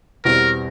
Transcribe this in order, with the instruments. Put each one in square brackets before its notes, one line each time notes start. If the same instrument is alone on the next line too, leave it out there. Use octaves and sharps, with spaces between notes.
[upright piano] E2 B2 G3 C4 [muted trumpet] A#4